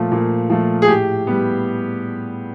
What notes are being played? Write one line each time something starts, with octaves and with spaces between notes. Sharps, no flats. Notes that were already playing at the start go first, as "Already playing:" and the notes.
Already playing: A#2 F3 A3
A#2
F3 A3
G#4
A2 G4
G3 B3